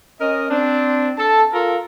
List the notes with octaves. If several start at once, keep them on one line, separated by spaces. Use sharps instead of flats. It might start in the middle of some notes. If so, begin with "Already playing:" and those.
C#4 A#4 D#5
C4 D4
A4 A5
F4 A4 A#4